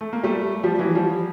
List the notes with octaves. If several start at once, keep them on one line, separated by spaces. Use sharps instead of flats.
A3
A#3
G3 A3
F3 G3
E3 F#3
F3 G3